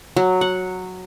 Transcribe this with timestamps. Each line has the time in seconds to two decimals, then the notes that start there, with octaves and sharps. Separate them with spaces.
0.16 F#3
0.41 F#5